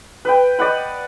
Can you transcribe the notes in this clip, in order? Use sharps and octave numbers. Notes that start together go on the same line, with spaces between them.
B4 G5
D5 D#5 F#5 B5